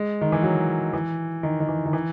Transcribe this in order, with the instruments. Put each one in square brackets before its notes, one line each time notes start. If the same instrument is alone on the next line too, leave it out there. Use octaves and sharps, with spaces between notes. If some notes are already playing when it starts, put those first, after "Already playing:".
Already playing: [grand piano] G#3
D#3
E3
F#3
E3
D#3
D#3
E3
D#3
E3